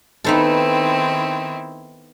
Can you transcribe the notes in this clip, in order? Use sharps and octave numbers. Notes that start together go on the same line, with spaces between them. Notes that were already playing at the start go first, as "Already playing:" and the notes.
D#3 B3 C4 D#4 E4 A4